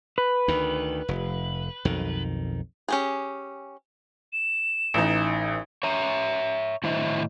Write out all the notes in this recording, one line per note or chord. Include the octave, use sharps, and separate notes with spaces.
B4
D2 D#3
F1
B1 F2 D#3
C#4 G4 G#4
E7
A1 E3 D#4
C#5 E5 A#5
A2 D#3 E4 C5 D#5 E5